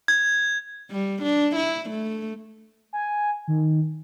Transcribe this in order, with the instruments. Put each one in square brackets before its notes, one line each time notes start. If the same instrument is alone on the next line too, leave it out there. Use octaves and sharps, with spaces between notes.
[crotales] G#6
[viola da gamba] G3
D4
E4
A3
[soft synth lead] G#5
D#3